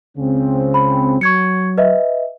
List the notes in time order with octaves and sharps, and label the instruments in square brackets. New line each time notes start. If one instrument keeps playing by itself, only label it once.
[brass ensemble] C#2 C#3 C4
[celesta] B5
[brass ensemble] F#3 [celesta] C#6 G#6 C#7
[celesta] B4 D#5 E5